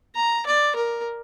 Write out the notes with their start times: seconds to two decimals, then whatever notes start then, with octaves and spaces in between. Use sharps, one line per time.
0.15 A#5
0.47 D5
0.76 A#4